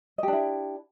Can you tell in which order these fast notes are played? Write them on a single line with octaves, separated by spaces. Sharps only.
D#5 G4 D4 E4